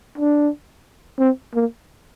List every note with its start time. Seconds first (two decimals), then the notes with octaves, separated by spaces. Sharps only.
0.18 D4
1.19 C4
1.54 A#3